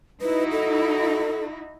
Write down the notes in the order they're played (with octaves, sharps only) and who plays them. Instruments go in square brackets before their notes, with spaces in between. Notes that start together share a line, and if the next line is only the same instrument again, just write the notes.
[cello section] D#4 E4 F#4 [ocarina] B4
[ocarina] A4